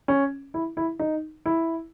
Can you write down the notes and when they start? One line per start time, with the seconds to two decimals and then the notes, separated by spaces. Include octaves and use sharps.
0.08 C#4
0.54 E4
0.77 E4
0.99 D#4
1.46 E4